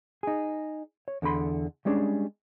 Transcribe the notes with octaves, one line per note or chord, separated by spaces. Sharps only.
D#4 G#4
C#5
E2 D3 A4 B5 C6
G3 G#3 C#4 D4 G#4